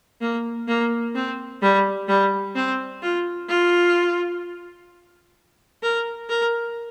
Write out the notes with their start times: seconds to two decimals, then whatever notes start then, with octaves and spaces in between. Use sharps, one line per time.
0.21 A#3
0.68 A#3
1.15 C4
1.62 G3
2.08 G3
2.55 C4
3.02 F4
3.49 F4
5.83 A#4
6.29 A#4